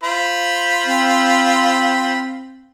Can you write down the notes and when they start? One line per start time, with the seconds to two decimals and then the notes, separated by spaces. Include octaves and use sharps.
0.03 F4 C5 B5
0.85 C4